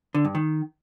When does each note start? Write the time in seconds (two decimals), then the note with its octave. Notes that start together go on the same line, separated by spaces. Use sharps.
0.14 D3
0.25 G2
0.35 D#3